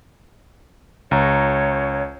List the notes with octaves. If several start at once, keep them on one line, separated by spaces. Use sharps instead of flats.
C#2 C#5 A#5